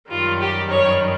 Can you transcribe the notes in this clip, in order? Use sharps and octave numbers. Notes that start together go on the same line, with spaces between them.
F#2 D#3 G3 F4
G4
C#5